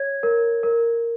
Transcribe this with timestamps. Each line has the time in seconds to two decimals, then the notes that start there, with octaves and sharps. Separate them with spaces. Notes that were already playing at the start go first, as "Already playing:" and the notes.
Already playing: C#5 G#6
0.23 A#4
0.63 A#4